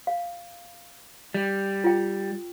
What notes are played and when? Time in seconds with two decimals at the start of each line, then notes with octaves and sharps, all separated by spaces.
0.07 F5
1.34 G3
1.84 F4 G5